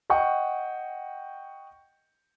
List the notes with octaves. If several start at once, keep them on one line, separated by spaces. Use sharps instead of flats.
D#5 F#5 G5 C#6